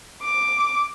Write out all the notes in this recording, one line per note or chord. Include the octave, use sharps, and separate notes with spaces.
D6